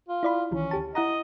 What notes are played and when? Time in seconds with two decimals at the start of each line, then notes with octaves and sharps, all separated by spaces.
0.08 F4
0.23 E4 D5 B5
0.51 C2 D#3 E3 C#4
0.71 D2 G4 A5
0.95 E4 D#5 F#5 A#5